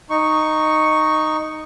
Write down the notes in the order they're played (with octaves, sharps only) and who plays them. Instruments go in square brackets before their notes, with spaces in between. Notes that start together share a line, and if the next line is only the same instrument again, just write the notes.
[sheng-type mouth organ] D#4 C#6